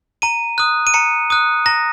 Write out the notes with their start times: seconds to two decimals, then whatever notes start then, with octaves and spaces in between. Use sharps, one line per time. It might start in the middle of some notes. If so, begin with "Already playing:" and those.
0.22 A#5 D#7
0.58 D#6 F#6
0.87 D#7
0.94 A#5 C#7
1.30 D#6 F#6
1.66 A#5 A#6